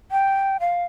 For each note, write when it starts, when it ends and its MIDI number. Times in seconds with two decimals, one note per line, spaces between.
0.11 0.57 79
0.60 0.84 77